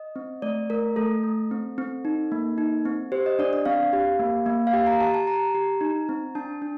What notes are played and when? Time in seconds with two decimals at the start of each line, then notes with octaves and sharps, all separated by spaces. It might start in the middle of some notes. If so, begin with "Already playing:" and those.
Already playing: D#5
0.16 C4
0.42 A3 D5
0.70 A3 A#4
0.96 A3 A4
1.23 A3
1.51 C4
1.78 C4
2.05 D#4
2.32 A#3
2.58 D#4
2.85 C4
3.12 G4 C5
3.26 D#5
3.39 D4 D5
3.53 D5
3.66 C4 F5
3.93 G4
4.19 A#3
4.46 A#3
4.67 F5
4.73 G4 G5
4.87 A#5
5.00 G4 A5
5.14 A5
5.27 G4 A#5
5.55 G4
5.81 D#4
6.09 C4
6.35 D4 A5
6.62 D4